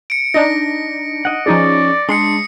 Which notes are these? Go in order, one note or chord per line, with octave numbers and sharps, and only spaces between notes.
C#7 D7
D4 D#4 A#6
D#5 F#5
F3 C#4 D#4 G#4 D5
G#3 D4 C6 D#6 C7 C#7